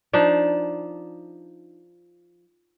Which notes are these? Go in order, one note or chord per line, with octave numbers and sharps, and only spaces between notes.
F3 D4 D#4